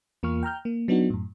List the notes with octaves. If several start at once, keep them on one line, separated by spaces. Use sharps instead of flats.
E2 A#3 F4 C#6 F6
G5 A#5 F6 G6
A#3
F#3 B3 D4 D#4 F#4
F#2 A2